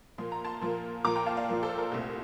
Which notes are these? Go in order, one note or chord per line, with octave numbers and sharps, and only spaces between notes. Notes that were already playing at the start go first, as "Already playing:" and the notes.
A#2 F3 A#3 C6
A#5
A5 C6
A#2 F3 A#3
A#2 F3 A#3 A#5 D6
G5 A#5
F5 A5
D5 F5
A#2 F3 A#3
A4 C5
A#4
C2 A#2 A3 C4